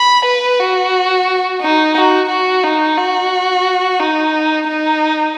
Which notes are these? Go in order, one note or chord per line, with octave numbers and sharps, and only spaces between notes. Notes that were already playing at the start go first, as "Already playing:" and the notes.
Already playing: B5
B4
F#4
D#4
F#4
F#4
D#4
F#4
D#4
D#4